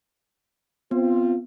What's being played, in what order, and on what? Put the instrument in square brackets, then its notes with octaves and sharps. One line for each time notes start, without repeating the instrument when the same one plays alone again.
[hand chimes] B3 [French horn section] C4 F4